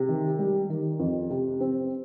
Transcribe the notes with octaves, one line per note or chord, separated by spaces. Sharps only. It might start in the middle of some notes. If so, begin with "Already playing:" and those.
Already playing: C3
D#3
G3
D#3
F2
C3
C4